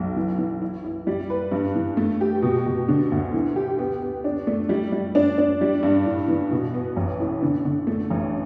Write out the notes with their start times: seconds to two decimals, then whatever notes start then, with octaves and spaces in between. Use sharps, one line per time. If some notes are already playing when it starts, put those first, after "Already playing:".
Already playing: B1
0.16 E3
0.38 E3
0.62 E4
0.84 E4
1.07 G3
1.30 B4
1.52 G2
1.75 E3
1.97 A3
2.21 G4
2.42 B2
2.66 B2
2.88 D3
3.12 D2
3.34 E3
3.56 G4
3.79 B3
4.02 B3
4.24 D4
4.47 A3
4.69 G3
4.92 G3
5.15 D4
5.38 D4
5.61 G3
5.83 G2
6.05 A2
6.28 E3
6.51 B2
6.74 B3
6.97 A1
7.20 A2
7.42 D3
7.65 D3
7.87 A3
8.10 A1